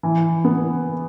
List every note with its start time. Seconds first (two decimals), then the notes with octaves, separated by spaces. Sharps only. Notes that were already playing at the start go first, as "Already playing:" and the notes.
0.03 E3
0.45 B3